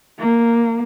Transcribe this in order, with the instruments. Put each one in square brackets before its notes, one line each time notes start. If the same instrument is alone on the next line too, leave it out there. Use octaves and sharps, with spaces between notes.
[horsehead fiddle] A#3